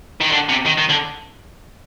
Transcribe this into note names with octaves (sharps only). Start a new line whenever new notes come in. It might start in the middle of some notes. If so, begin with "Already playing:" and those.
D#3
D3
C3
D#3
D#3
D3